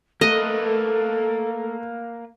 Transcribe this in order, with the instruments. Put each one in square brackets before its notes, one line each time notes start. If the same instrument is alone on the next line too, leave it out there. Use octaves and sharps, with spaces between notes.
[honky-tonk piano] A3 [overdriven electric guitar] A#3 B4 [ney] A4 [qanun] D#5